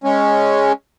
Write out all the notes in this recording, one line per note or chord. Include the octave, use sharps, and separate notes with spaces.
G#3 C#4